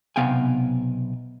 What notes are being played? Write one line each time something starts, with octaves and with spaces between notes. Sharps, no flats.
B1 C3 B3 F5 G5 G#5